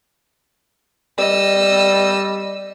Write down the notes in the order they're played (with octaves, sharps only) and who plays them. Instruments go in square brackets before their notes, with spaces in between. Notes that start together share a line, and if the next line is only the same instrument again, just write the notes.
[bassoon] G3 [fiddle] D#5 E6